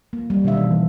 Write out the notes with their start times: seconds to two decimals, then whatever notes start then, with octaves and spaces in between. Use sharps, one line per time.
0.13 A#3
0.30 G3
0.44 B2 D#3 F#3 D4 E5 F5
0.57 E3
0.72 F#3